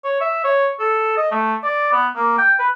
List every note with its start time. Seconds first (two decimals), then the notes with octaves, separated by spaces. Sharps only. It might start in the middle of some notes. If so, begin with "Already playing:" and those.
0.04 C#5
0.20 E5
0.44 C#5
0.80 A4
1.17 D#5
1.31 A3
1.64 D5
1.92 B3
2.16 A#3
2.38 G5
2.59 B4